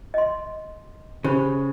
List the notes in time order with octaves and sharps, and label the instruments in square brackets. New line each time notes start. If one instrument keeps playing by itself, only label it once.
[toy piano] D#5 C6
[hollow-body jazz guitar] C#3 [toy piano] G4 C5 B5